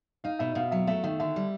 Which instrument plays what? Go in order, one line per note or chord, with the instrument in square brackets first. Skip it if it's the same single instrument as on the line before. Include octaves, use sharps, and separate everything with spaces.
[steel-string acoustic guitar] D#4 [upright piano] F5
[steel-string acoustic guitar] B2 [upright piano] E5
[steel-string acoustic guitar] B2 [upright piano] F5
[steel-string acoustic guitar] F#3 [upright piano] E5
[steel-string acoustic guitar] A3 [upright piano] E5
[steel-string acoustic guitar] D#3 [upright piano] E5
[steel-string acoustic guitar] D3 [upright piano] E5
[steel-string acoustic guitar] G3